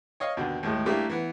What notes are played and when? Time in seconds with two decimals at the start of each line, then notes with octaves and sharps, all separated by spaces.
0.20 C#5 D#5 F5
0.37 D#2 B2 D3
0.63 D#2 A2 G#3
0.86 G3 A3 A#3 D4 E4 G4
1.10 E3 B3